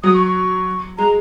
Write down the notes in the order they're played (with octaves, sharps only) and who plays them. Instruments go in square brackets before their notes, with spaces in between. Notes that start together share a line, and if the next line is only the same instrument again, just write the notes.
[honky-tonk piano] F#3 [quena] D#6
[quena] C#6
C#6
[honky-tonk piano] G#3 [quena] A#5